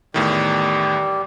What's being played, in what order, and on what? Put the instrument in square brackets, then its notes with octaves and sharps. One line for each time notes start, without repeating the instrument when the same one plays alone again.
[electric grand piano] E2 A2 D#3 [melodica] G3